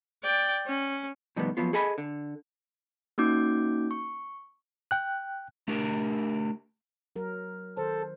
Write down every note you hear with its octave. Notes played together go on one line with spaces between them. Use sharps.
D5 G5
C#4
B2 D#3 F3 G3 A3 B3
F3 F#3 B3 F4
G#4 A4 D#5 G#5 B5
D3
A#3 C#4 D#4 F#4 D6 G6
C#6
G5 F#6
A3 D4 G4 A#4
F#3 A#4
D#3 A4 C5